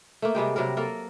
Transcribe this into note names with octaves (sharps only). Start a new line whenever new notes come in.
A3 A#3
C3 G3 G#3 G4
C3 F#3 G3 A#4
A#3 A4 A#4